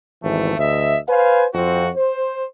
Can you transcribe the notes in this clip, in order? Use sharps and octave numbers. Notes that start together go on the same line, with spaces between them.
G#1 E2 E3 A3
D2 D#5 E5
B4 C5 F5 G#5
F2 C4 F4 F#4
C5